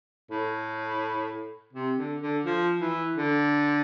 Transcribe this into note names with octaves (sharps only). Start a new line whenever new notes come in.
A2
C3
D3
D3
F3
E3
D3